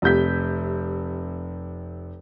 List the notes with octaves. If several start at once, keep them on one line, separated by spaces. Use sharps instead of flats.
F1 C3 G6 B6